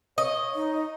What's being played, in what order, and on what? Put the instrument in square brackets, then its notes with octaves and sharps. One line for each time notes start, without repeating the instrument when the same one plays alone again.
[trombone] C#5 [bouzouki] D#5
[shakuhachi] D#4